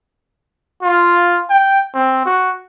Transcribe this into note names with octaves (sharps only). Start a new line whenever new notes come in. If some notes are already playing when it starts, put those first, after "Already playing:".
F4
G5
C4
F#4